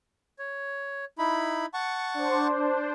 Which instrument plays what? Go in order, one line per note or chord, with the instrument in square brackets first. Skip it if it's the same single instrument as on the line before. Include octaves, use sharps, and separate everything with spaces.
[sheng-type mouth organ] C#5
D#4 E4 B5
F#5 A5 C#6
[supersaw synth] D4 C5